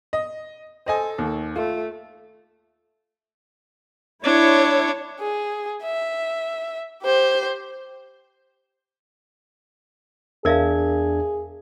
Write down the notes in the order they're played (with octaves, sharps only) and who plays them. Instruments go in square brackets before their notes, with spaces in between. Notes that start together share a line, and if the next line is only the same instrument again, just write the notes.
[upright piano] D#5
[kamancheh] A4 [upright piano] C5 D#5 G#5
[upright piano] D#2
[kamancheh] A3 [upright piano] F4
[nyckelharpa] D4 [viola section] E4 C#5
[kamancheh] G#4
E5
G4 C5
[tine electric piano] E2 D4 G#6 [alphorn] G#4 [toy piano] A#4 E5 F5